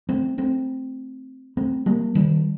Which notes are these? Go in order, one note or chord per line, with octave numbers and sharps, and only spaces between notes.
A3 C4
A3 C4
A3 C4
G3 A#3
D#3 G3